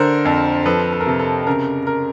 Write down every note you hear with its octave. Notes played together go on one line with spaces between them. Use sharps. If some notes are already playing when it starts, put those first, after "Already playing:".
Already playing: D3 A#4 C5
F2
F3 A4 B4
A4
A#4
C3 A4
A4
C#3 A#4
A#4